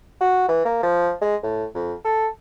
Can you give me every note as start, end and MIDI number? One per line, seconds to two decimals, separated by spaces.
0.21 0.48 66
0.49 0.64 52
0.65 0.81 58
0.83 1.13 53
1.21 1.36 56
1.43 1.65 45
1.75 1.93 41
2.05 2.28 69